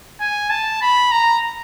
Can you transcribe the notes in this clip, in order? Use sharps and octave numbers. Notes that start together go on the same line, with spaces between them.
G#5
A5
B5
A#5